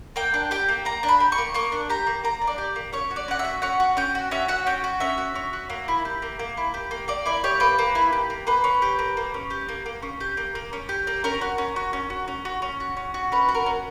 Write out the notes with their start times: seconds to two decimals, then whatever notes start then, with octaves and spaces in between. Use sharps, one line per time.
0.16 A#3 G5
0.34 D4
0.51 G4 G5
0.69 A#3
0.85 A#3 A#5
1.03 D4
1.09 B5
1.20 G4
1.32 C#6
1.38 A#3
1.54 A#3 C#6
1.72 D4
1.89 G4 A#5
2.07 A#3
2.24 A#3 A#5
2.42 D4
2.47 D5
2.58 G4
2.76 A#3
2.93 C#4 C#5
3.11 F#4
3.16 D5
3.28 C#4 F#5
3.39 E5
3.45 F#4
3.62 C#4 F#5
3.80 F#4
3.97 C#4 G5
4.15 F#4
4.31 C#4 E5
4.48 F#4 F#5
4.67 C#4 G5
4.84 F#4
5.00 C#4 E5
5.18 F#4
5.35 C#4
5.53 F#4
5.70 A#3
5.88 E4
6.05 G4
6.22 A#3
6.39 A#3
6.57 E4
6.74 G4
6.91 A#3
7.08 A#3 D5
7.26 E4 D5
7.44 G4 C#5
7.60 A#3 B4
7.78 A#3
7.95 E4
8.13 G4
8.30 A#3
8.47 A#3 B4
8.64 C#4
8.82 G4
8.99 A#3
9.17 A#3
9.34 C#4
9.50 G4
9.68 A#3
9.86 A#3
10.03 C#4
10.21 G4
10.37 A#3
10.55 A#3
10.73 C#4
10.89 G4
11.07 A#3
11.24 C#4 A#4
11.41 F#4
11.58 C#4
11.76 F#4
11.93 C#4
12.10 F#4
12.28 C#4
12.45 F#4
12.62 C#4
12.80 F#4
12.97 C#4
13.14 F#4
13.32 C#4 B4
13.49 F#4
13.55 A#4
13.66 C#4